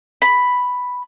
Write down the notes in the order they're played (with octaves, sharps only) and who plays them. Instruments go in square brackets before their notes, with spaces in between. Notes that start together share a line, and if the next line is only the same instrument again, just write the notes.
[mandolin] B5